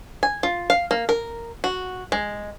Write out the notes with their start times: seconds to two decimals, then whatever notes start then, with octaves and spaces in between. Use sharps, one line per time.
0.23 G#5
0.43 F4
0.70 F5
0.91 A#3
1.09 A#4
1.64 F#4
2.12 G#3